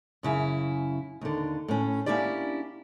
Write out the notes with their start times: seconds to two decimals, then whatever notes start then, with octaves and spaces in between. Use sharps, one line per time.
0.23 F#2 C#3 E4
1.21 D#2 D3
1.68 A2 C#4
2.06 A#3 C#4 D4 E4 G4 D5